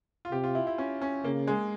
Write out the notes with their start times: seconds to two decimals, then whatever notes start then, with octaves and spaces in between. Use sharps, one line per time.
0.25 F4
0.32 C3 G4
0.44 F4
0.55 E4
0.67 E4
0.78 C#4
1.01 C#4
1.24 C#3 A#3
1.47 G#3